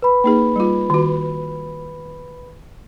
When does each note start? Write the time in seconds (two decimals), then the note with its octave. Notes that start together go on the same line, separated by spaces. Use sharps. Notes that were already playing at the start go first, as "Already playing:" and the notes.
0.02 B4 B5
0.24 A#3 D#4 G#4
0.56 G3 F4
0.90 D#3 F#4